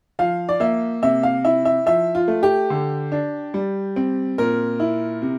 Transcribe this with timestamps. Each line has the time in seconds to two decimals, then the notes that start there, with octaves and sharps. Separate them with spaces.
0.19 F3 F5
0.49 D5
0.60 A#3 E5
1.03 C3 E5
1.23 F5
1.44 E4 E5
1.65 E5
1.86 F3 E5
2.15 F4
2.28 A3
2.43 G4
2.70 D3
3.12 D4
3.54 G3
3.96 C4
4.38 A#2 A#4
4.80 E4
5.22 C3